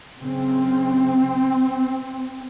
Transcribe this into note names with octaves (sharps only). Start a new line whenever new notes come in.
F#2 C#3 C4